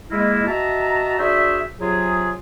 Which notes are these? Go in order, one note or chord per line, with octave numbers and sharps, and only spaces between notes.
G#3 A#3 E4
F#4 D#5 E5 A5 A#5
D4 F#4 G#4 C5 E5
C3 F#3 F4 G#4